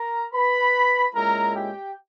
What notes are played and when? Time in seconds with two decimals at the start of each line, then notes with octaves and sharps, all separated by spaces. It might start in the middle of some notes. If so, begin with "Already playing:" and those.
Already playing: A#4 A#5
0.33 B4 B5
1.14 A#2 G#3 C#4 E4 A#4 A#5
1.54 G4 G5